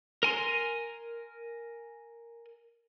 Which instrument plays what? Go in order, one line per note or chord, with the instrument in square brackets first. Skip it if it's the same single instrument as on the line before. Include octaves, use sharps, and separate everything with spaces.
[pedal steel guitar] A#4 G#5 C6